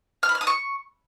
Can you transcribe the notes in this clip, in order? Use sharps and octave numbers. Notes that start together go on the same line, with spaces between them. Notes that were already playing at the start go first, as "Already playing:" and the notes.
F6
B5
F6
D#6
C#6